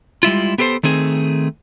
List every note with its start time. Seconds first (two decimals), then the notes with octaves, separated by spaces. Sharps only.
0.23 G3 G#3 E4 F4
0.58 B3 G4 A4 B4 C5
0.83 D#3 A3 C4 G#4